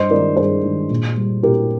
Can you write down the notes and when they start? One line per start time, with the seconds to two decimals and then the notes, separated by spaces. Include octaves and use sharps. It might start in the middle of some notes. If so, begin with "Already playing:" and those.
Already playing: G2 C5 D#5
0.10 D#3 G#3 A#4 D5
0.37 G2 G#4 C5
0.63 D#3 G#3
0.90 A#2
1.17 G3
1.43 A#2 G4 A#4